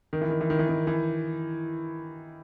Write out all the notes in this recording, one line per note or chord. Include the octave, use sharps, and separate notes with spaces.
D#3
E3
D#3
E3
D#3
E3
D#3
E3